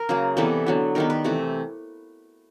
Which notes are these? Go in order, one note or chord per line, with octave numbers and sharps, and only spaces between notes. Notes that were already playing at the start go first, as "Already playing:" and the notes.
Already playing: A#4
C#3 F#3 A#3 G#4
C3 E3 G3 B3 A4
D3 F#3 B3
D#3 G3 B3 A#4
B4
C3 E3 A3